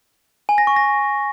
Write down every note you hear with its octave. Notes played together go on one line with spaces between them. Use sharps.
G#5
A#6
C#6
A#6